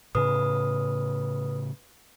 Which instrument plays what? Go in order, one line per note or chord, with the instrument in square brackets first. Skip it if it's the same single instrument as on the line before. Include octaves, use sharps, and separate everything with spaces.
[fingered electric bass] A2 C#3 [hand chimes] B4 D#6